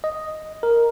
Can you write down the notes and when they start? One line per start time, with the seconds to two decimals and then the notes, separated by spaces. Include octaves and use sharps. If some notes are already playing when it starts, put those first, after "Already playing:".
0.04 D#5
0.63 A#4